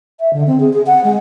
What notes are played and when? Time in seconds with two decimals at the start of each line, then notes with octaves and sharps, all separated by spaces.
0.20 E5
0.33 D3
0.47 C4
0.60 G#4
0.73 G#4
0.86 F#5
1.04 G#3